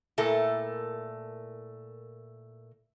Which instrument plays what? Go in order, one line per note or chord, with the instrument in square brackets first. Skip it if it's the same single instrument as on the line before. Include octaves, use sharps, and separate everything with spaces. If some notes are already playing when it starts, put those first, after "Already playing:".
[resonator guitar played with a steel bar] A#2 A3 E4 A4 A#4